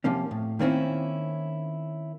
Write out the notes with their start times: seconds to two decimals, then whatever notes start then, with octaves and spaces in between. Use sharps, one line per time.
0.04 C3 F3 A#3 C#4
0.31 A2
0.59 D#3 A#3 C4 C#4 E4